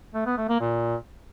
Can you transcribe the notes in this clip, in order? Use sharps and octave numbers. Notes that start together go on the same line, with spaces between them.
A3
B3
A3
A#3
A#2